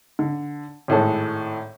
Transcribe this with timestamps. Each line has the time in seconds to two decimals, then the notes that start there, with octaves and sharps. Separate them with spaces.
0.19 D3
0.88 G#1 A2 G#3 A4